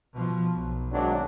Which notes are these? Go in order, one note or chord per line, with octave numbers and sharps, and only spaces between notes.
B2 F3
B1
G#1 F#3 D4